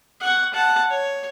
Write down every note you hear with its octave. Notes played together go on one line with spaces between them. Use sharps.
F#5 C#6
F#5 A5
C#5